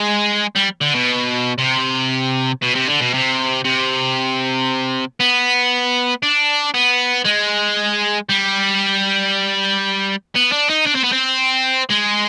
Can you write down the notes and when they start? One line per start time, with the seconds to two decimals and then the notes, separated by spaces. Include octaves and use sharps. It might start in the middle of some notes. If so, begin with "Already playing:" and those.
Already playing: G#3
0.55 G3
0.81 D3
0.94 B2
1.58 C3
2.62 B2
2.75 C3
2.88 D3
3.01 B2
3.14 C3
3.65 C3
5.20 B3
6.23 D4
6.74 B3
7.26 G#3
8.29 G3
10.36 B3
10.52 D4
10.70 D#4
10.87 D4
10.96 C4
11.04 B3
11.13 C4
11.90 G#3